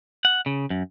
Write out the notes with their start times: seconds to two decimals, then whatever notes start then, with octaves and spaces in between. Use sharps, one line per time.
0.25 F#5
0.46 C#3
0.70 F#2